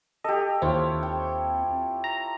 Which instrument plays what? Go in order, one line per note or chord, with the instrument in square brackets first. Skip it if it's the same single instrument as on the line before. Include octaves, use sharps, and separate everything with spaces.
[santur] G4 A4 [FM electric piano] D#5
[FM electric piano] D#2 C4 [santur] E4 F4 C#5
[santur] G5
[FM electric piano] A#5